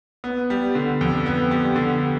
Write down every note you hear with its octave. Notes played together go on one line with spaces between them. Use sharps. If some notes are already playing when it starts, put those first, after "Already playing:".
B3
G3
D3
F2
B3
G3
D3